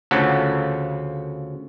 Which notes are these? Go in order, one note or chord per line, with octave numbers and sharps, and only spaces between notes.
D2 C#3 F3 A4 F#5